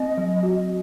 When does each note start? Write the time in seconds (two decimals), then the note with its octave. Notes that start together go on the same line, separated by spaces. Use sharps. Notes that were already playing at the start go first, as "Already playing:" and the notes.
Already playing: C4 D#5
0.17 F#3
0.43 F#4